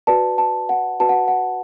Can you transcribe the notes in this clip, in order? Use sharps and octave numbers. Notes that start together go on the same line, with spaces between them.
F#4 B4 D5 A5
A5
F#5
F#4 B4 D5 A5
F#5
F#5